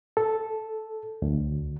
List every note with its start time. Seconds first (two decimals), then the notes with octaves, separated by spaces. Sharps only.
0.17 A4
1.22 D2